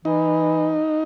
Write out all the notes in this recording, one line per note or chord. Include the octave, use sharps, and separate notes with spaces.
E3 D#4